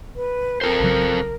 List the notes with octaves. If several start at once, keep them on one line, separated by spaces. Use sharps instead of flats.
B4
C4 A4 A#4 C5
A#1 C#3 F#3